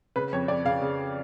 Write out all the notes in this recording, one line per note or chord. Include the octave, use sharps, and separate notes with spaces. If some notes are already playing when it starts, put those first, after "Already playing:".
C#3 B4
F2 C#5
F2 D5
C#3 F5
C#3